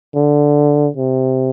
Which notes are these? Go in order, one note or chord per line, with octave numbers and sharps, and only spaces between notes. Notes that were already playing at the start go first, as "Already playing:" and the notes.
D3
C3